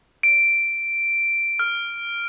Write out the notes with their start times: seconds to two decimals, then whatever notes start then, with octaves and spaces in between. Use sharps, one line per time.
0.23 D7
1.59 F6